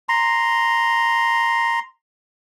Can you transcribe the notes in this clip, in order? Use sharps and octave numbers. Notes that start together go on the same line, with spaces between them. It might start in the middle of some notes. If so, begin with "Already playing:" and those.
A#5 C6